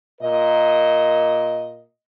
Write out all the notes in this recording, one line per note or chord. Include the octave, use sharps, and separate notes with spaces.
A#2 A#4 D#5